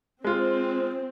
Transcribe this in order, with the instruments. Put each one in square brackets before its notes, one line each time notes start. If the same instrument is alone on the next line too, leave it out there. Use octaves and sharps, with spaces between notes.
[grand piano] G#3 F4 [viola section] C4